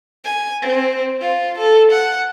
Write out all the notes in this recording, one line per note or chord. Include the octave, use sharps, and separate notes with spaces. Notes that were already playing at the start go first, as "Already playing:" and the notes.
G#5
C4
F4
A4
F#5